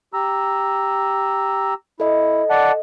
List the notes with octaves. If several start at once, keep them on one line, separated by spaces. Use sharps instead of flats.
G4 A#5 E6
E4 A4 D#5
D5 F#5 A5